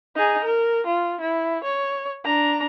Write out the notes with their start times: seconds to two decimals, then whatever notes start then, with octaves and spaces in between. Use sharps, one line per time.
0.16 D#4 G#4
0.45 A#4
0.86 F4
1.21 E4
1.64 C#5
2.25 D4 A#5